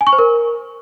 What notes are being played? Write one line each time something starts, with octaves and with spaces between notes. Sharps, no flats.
G#5
C#6
C5
A#4